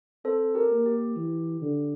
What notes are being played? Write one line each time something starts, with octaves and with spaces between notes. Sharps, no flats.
C4 A4 C5
G4 A#4
A#3
G4
E3
D3